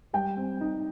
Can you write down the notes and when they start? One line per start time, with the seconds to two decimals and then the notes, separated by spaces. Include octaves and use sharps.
0.13 G3 G5
0.37 C4
0.61 D#4